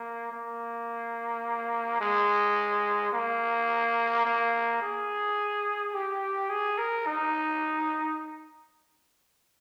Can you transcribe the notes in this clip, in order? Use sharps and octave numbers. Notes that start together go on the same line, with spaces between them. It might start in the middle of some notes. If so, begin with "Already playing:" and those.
Already playing: A#3
A#3
G#3
A#3
A#3
G#4
G4
G#4
A#4
D#4